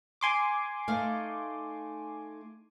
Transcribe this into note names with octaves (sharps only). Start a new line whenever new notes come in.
G#5 C6 D6
A3 D#4 F5